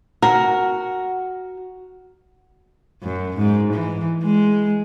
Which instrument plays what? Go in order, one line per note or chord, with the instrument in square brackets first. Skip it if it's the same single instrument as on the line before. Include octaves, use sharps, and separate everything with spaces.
[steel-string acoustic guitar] F#4 [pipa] A#4
[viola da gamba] F#2
G#2
E3
G#3